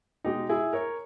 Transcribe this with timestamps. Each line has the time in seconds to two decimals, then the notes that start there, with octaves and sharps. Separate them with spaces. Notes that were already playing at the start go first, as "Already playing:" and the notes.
0.24 B2 G#3 D#4 G4
0.49 E4 G#4
0.73 A#4 C#5